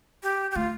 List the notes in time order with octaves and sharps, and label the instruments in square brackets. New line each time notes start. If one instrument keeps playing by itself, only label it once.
[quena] G4
G4
[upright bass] A3 [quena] F4